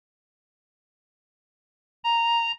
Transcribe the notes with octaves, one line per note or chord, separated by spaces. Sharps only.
A#5